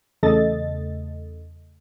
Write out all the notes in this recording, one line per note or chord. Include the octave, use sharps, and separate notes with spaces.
E2 C#3 A3 A4 D#5 A6